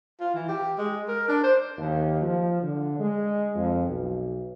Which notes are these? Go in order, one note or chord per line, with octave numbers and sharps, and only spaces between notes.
F4
E3
G4
G#3
A#4
D4
C5
D#2
F3
D3
G#3
F2
B1